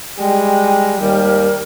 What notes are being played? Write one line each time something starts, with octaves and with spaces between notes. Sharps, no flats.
G3 G#3 G5
D#2 G3 A#4